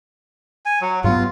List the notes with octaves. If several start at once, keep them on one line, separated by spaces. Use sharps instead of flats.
G#5
F#3
G2 F#3 B3 F4